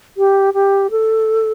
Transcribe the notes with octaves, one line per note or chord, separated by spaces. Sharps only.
G4
G4
A4